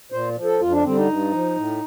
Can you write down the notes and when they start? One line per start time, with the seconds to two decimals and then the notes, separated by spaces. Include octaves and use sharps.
0.12 A#2 C5
0.36 F3
0.44 A4
0.59 F2 F4
0.71 D4
0.84 D3 G3 C4
0.96 D#4
1.08 G2
1.32 F3
1.56 A2